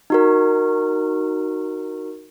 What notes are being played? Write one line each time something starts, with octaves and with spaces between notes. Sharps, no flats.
D#4 F#4 A#4